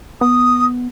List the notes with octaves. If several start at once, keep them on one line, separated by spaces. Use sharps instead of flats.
B3 D#6